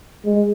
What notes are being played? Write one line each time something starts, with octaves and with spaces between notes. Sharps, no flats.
G#3